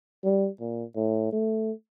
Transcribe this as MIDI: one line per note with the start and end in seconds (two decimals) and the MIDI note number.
0.24 0.49 55
0.60 0.84 46
0.96 1.32 45
1.32 1.72 57